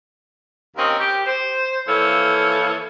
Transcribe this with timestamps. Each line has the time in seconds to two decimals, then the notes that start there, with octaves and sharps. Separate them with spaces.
0.77 D#2 C4 C#4 A#4 D#5
0.99 G4
1.26 C5
1.87 E3 F3 A#3 A4 C#5